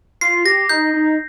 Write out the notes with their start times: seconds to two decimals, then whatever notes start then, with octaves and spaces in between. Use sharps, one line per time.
0.21 F4 C7
0.45 G4 A#6
0.69 D#4 G6
0.94 D#4